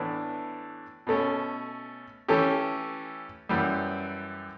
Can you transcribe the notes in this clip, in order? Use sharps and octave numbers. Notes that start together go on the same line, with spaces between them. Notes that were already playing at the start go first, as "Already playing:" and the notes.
Already playing: A2 E3 B3 D4
B2 A3 C#4
E3 A3 C#4 G4
F#2 E3 G3